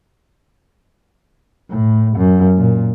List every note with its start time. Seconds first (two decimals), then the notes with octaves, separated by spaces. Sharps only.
1.70 A2
2.17 F#2
2.57 A#2